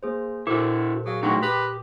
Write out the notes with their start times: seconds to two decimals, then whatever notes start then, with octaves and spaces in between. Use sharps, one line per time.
0.03 A#3 G#4 C5
0.47 A#2 E4 F#4 A4 C5
1.06 F#3 G#4 F5
1.23 A2 F#3 D#4 F#4 G5 C6 A#6
1.43 G4 B4 D#6